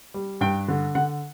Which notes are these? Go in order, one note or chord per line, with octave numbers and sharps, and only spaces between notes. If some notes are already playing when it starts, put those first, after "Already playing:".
G3
G2 G5
D3
D3 F#5